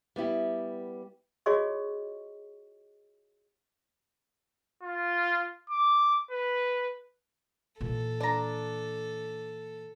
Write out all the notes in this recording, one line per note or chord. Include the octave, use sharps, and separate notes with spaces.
G3 B3 E4 G4
F4 F#4 G#4 C#5 D#5 C#6
F4
D6
B4
A#2 E3 A4
D4 A#5